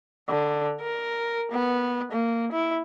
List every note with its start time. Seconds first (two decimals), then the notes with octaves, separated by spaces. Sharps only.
0.29 D3
0.81 A#4
1.52 B3
2.12 A#3
2.52 E4